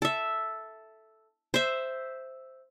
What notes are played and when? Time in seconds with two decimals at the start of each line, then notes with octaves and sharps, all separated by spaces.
0.02 A4 E5
1.54 C5 E5